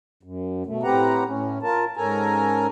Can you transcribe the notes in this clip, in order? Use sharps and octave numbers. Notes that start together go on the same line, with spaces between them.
F#2
B2 A3
A2 C4 G4 B4 F#5 A#5
A2 C#4
F4 A#4 A5
G#2 C#4 A4 A#4 G#5 A#5